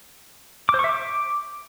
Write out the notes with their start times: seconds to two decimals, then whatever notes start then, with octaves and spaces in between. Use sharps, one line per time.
0.69 D6
0.74 C5
0.79 C#6
0.84 E5
0.89 D6